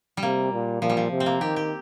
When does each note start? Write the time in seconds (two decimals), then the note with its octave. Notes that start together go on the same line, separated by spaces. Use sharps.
0.17 G3
0.23 C3 A#3
0.53 A#2
0.82 A#2 F3
0.89 G3
0.97 F3
1.11 C3
1.20 C4
1.26 A#3
1.41 D#3 G4
1.56 G4